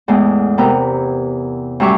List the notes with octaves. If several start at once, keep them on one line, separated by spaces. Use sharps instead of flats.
E2 A2 G#3 B3
C3 B3 E4 A#4 G5
F#2 A2 G3 E5 C#6 D6